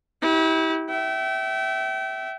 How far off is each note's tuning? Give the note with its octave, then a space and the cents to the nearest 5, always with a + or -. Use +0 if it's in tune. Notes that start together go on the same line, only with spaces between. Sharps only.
E4 -35 G4 -15
E5 +0 G5 -35